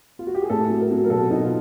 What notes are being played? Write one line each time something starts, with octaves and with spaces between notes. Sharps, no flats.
F4
F#4
G4
G#4
A2 A4
F#3
A#4
F#3
A#4
B2 A4
B2 D#4
F4